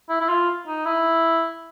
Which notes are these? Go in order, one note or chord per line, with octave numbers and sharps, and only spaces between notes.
E4
E4
F4
D#4
E4